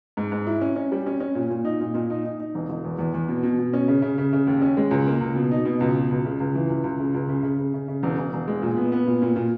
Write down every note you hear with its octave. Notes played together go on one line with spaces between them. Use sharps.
G#2
G#2
E4
C#4
C#4
G3
C#4
C#4
A#2
A#2
D#4
A#2
A#2
D#4
D#4
D#4
E1
E1
E2
E2
E2
B2
B2
B2
C#4
C#3
C#3
C#3
C#3
D#2
C#4
G#3
C#2
A#3
C#2
B2
D#4
B2
C#2
B2
C#2
C#3
C#2
E3
C#2
C#2
C#3
C#2
C#3
C#3
C#3
C#3
C#3
E1
E1
E1
G#3
A#2
B3
B3
A#2
A#2
A#2